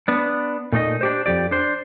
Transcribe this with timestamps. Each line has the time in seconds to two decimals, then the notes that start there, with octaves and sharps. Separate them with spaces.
0.08 B3 D4
0.72 A#2 A3 D#4 D#5
1.01 D4 G4 C5
1.26 F2 F3 G4 D5
1.51 D4 C5